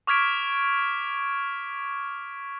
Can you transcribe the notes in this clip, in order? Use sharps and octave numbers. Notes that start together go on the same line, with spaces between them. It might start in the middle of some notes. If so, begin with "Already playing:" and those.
C#6 D6 F6 G#6 B6 D7